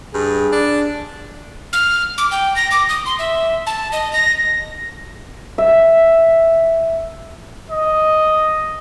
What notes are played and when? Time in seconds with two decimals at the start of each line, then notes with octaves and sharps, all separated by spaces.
0.14 G2 G#4
0.52 D4
1.73 F6
2.18 D6
2.31 G5
2.56 A#6
2.71 D6
2.89 D#6
3.06 C6
3.19 E5
3.66 A5
3.92 D#5
4.13 A#6
5.58 E5
7.70 D#5